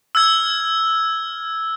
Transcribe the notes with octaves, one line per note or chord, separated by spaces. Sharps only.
E6 F6 G#6